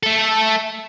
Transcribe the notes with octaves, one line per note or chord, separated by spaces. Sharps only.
A3 A4